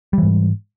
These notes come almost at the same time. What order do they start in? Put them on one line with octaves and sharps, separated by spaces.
G3 E3 G#2